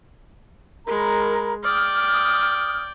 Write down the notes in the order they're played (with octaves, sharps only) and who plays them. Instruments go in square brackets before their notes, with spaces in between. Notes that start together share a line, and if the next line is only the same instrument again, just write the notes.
[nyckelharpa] G#3 [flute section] A#4 A#5 B5
[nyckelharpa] D5 G5 [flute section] D#6 F6